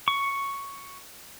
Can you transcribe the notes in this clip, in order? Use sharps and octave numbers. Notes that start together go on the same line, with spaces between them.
C#6